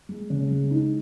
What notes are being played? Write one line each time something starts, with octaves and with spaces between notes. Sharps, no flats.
G#3
C#3
G#3
D#4